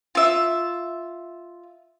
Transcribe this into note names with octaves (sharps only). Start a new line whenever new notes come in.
F4 E5